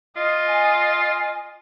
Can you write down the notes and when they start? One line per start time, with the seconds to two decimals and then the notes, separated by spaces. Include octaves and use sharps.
0.17 F4 D#5
0.47 G#5